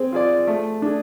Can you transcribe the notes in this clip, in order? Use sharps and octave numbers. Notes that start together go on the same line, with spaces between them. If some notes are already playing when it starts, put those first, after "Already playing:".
Already playing: C4 G#4
F4 G#4 D5
A3
D4 G#4